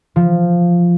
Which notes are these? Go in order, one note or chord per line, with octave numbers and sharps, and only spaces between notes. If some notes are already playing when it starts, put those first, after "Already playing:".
F3